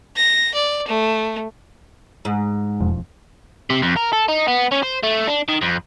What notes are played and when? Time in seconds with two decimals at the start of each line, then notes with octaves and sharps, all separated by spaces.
0.17 A#6
0.54 D5
0.88 A3
2.25 G#2
2.80 E1 F2
3.70 C3
3.82 F2
3.96 A#4
4.13 A4
4.28 D#4
4.48 B3
4.71 C#4
4.83 C5
5.03 A3
5.27 D4
5.48 D#3
5.61 F2